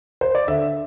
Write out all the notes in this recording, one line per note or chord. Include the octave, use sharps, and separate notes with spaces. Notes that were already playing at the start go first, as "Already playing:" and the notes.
C5
D5
D3 E5